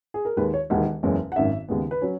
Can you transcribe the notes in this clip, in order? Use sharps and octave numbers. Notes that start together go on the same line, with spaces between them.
G#4
A#4
D#2 D#3 G#3 B4
C#5
E1 D#2 D#3 F#5
F#1 E2 C#3 G#3 C#4
F#5
G#1 F#2 D#3 E5
D#2 C#3 G#3 B3
B4
F#3 C#4 C#5